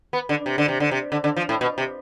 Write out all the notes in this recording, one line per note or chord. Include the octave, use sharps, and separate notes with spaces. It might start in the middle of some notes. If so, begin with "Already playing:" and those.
B3
D3
C3
D3
C3
D3
C3
D3
D3
F3
A2
B2
C3